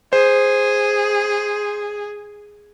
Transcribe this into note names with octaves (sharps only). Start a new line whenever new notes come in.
G#4 C5